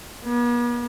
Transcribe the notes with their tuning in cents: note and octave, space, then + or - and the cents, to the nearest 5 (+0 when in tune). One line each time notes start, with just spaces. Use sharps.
B3 -45